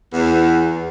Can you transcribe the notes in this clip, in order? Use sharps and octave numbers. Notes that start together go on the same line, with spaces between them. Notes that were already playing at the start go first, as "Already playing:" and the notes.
E2